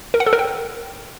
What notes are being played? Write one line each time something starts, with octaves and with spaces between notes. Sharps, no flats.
A#4
F#5
A4
A#4
G5